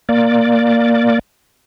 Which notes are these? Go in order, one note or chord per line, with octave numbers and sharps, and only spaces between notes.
A#3 D5